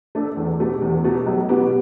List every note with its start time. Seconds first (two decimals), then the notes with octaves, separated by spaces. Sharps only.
0.15 A3 D4 A4
0.37 E2
0.59 B2 A3 G4
0.82 E2
1.04 B2 A3 G4
1.26 B1
1.49 B2 B3 G4